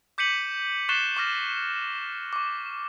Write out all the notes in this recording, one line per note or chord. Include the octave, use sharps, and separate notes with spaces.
D6 G6 B6 C#7 D#7 F#7
C#6 F#6 A6 C7 E7 G7
C#6 D6 F6 A#6
C#6 D6